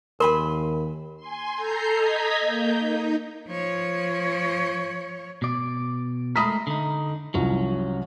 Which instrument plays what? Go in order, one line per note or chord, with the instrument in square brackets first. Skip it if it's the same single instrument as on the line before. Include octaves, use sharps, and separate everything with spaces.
[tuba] D#2 [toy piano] A#4 [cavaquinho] G#5 B5 C6
[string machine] G#5 C6
A4 A#5 G6 C7
D#5 A#5 G#6 B6
A#3 G6
D#4
[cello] F3 C#5
[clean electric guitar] B2 D5
[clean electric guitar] G#3 A3 A#4 [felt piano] B5 D#6 B6
[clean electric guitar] D3 D#4
[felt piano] C2 F3 [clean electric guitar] F#3 C#4